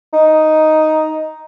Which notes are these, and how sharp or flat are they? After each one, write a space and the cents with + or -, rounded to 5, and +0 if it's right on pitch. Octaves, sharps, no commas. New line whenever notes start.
D#4 +5